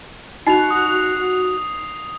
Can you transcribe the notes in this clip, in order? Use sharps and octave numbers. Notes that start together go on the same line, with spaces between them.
D#4 F#4 D#5 B5 C7 F7
D#6